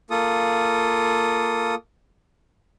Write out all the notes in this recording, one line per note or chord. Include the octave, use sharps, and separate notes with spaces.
A#3 F4 A4 D#6